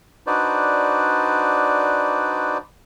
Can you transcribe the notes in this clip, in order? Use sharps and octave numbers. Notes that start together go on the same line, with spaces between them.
D4 D#4 F#4 B4 C5 D5